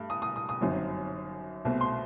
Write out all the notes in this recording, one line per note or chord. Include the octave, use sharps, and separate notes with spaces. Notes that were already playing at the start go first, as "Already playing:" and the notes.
Already playing: G2 A3
D#6
D#6
D#6
D#6
G1 F#2 F#3 C4 D#4
C2 B2 A3 C4
C6